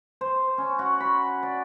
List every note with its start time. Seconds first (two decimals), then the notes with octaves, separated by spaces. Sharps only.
0.21 C5
0.58 C#4
0.79 F#4
1.00 B5
1.43 D5